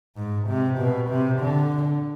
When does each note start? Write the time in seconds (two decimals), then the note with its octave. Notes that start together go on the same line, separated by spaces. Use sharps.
0.17 G#2
0.48 C3
0.79 B2
1.09 C3
1.40 D3